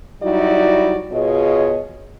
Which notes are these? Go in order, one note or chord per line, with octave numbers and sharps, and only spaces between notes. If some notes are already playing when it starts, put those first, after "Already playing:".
F#3 G3 D#4 E4 F#4 D5
B2 F4 G#4 C#5 D#5